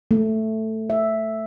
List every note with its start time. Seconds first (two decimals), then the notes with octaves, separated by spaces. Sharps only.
0.11 A3
0.90 E5